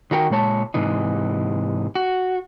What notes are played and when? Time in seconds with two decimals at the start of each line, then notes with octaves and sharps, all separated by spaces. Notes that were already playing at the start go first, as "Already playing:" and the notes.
0.11 D#3 F#4 A#4 G5
0.30 A#2 G#3 C#5 A5
0.74 G#2 C3 E3 D#4
1.95 F#4